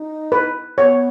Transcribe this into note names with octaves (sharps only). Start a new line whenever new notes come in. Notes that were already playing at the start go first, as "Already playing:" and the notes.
Already playing: D#4
B4
B3 C#5